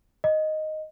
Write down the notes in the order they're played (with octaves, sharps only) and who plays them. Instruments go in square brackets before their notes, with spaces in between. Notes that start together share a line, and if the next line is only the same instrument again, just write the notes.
[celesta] D#5